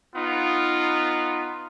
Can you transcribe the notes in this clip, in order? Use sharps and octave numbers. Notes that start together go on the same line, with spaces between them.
B3 D#4 F4